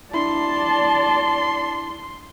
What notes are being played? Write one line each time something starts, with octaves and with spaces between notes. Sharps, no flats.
D4 E4 D5 A5 C6